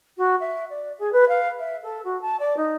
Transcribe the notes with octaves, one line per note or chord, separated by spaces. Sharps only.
F#4
E5
D5
G#4
B4
F5
E5
A4
F#4
A5
D5
D#4